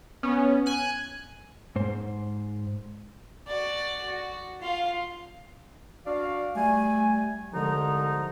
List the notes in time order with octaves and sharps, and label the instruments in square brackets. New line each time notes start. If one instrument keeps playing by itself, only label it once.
[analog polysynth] B3 C#4
G#5 F#6
[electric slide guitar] G#2 C5
[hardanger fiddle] F#4 D5
F#4
F4 F5
[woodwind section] D4 F#4 D5 F5
G3 A3 G#5
C2 D3 F3 G#3 D#4 A#5